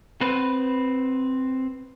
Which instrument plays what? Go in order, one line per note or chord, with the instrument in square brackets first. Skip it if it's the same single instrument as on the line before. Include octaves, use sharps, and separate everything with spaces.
[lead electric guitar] C4 B4